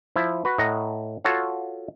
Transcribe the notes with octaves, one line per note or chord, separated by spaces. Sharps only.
F3 E4
F#4 B4
A2 D#5 F#5 A#5
F4 F#4 A4 C#5 F#5